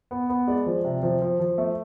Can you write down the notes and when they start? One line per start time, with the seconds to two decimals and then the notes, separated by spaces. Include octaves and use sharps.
0.11 B3
0.30 B3
0.48 G#3 D5
0.66 F3
0.84 C3
1.03 F3
1.22 F3
1.40 F3
1.58 A3